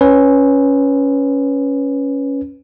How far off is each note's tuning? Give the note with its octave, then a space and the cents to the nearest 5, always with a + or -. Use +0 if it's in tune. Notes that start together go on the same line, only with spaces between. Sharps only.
C#4 +0 B4 +0